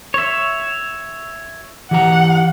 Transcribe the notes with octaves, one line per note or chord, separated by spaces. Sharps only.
C#5 E5
E3 G4 F#5 A#5